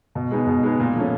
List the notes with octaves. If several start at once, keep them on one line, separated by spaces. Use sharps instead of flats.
B2
G#3 B3 D#4 G#4
B2
G#3 B3 D#4 G#4
A#2
F3 A3 C#4